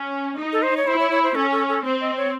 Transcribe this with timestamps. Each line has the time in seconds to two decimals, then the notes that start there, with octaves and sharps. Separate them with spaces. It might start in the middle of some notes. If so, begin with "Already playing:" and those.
Already playing: C#4
0.39 D#4
0.53 A4
0.63 C5
0.77 C#5
0.87 E4 C5
0.99 C#5
1.11 C#5
1.23 C5
1.35 C#4 A4
1.52 A4
1.69 A4
1.84 C4 C5
2.01 D#5
2.17 C#5